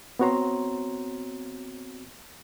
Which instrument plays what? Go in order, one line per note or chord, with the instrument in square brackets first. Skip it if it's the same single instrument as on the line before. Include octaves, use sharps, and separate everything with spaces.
[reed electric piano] B3 C4 F#4 C#5 A#5 C6